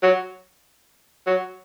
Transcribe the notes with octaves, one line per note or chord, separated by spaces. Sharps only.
F#3
F#3